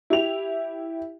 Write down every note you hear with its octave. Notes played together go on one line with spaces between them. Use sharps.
E4 G4 F7